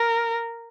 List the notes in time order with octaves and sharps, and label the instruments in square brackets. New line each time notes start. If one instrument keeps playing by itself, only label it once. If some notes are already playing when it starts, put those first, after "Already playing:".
Already playing: [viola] A#4